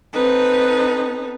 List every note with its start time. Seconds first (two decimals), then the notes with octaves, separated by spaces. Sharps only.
0.13 C4 D#4 A4 B4